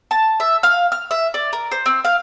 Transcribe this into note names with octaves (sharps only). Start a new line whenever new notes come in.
A5
E5
F5
F6
E5
D5
A#4
C5
C4
F5